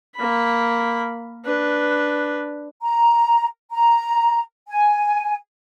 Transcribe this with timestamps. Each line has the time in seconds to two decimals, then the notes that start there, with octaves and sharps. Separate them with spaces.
0.16 A#3 B5
1.45 D4 B4
2.82 A#5
3.71 A#5
4.67 G#5